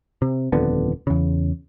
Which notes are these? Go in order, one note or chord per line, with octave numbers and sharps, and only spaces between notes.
C3
D#1 F2 D3 B3
E2 C#3